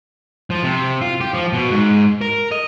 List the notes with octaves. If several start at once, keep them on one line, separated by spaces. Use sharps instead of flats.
F3
C3
F4
G4
F3
B2
G#2
A#4
D#5